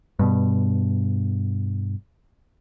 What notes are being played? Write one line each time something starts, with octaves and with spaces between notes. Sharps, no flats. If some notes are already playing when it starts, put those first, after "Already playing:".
G2 B2